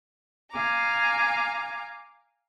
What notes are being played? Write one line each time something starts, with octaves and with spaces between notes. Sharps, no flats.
F5 G#5 A#5 D6